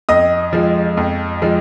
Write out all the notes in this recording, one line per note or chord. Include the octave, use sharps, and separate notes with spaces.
F2 D#5 D#6
F3 G#3
F2
F3 G#3